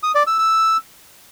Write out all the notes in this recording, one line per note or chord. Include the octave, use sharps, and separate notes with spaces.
D#6
D5
E6
E6